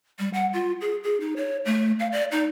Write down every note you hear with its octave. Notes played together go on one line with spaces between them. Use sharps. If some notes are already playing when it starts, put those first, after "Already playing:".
G3
F#5
F4
G#4
G#4
D#4
C#5
A3
F5
D5
D#4